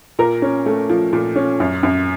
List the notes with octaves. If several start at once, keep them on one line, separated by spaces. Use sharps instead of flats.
A#2 A#4
C#4
A3
F3
A#2
C#4
F#2
F#2